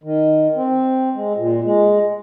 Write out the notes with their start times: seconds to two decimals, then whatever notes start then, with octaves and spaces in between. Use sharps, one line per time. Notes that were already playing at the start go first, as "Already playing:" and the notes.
0.04 D#3
0.55 C4
1.15 G#3
1.36 A#2
1.64 G#3